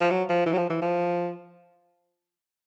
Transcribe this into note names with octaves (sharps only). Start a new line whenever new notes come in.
F3
F#3
F3
E3
F#3
F3
E3
F3